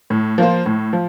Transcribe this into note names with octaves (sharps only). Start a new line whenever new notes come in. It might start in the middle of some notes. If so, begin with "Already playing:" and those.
A2
F3 A#3 F4 C5
A2
F3